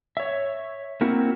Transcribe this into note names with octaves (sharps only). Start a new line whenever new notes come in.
C#5 E5
A#3 C4 E4 F#4 A#4